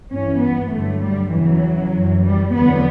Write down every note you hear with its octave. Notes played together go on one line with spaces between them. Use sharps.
G2 E3 C#4
B3
G2 D3 F#3 A3
G3
E2 C#3 E3 F#3
F#2 E3
G3
E2 D3 F#3 B3